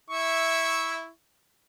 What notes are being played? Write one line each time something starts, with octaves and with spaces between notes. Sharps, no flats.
E4 E5 C#6